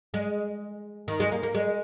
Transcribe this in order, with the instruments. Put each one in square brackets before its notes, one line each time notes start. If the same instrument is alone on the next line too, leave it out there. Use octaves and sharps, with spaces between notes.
[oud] G#3
D#3
G#3
A#3
A#3
G#3